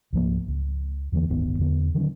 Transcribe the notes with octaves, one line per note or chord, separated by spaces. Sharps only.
C#2 G#2 F3 A#3
C#2
E2 D3 E3 A#3
D1 G1 D#3 B3
E2 D3 B3
D3 D#3 F#3 C#4